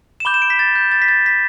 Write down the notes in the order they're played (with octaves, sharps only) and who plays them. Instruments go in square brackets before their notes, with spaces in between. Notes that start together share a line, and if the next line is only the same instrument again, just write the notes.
[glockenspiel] E7
B5 D6 G6 G7
E7
D7
B6
A6
G6
A6
B6
A6
B6